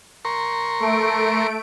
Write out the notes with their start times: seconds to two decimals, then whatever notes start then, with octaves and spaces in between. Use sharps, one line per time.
0.25 A#4 C6 C#6
0.80 A3 D7